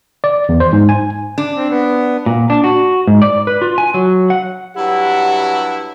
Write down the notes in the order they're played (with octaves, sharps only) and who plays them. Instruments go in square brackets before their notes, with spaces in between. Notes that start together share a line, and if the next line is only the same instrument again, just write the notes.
[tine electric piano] D5
E2
C5
G#2
G#5
[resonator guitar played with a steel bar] D4
[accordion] C4
B3
[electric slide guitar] A#2
D4
F#4
G#2
D5
B4
F4
G#5
F#3
F#5
[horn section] G2 F#3 E4 [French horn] G4 [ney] F#5